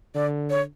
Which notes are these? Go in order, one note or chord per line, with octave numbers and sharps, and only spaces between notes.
D3 D5
C#5